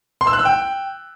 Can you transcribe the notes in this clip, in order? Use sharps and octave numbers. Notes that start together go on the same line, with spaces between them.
C6
E6
F#6
E6
G5